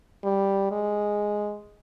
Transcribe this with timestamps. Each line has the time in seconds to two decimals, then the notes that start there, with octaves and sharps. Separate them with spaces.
0.24 G3
0.71 G#3